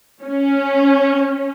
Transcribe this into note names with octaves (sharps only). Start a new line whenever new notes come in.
C#4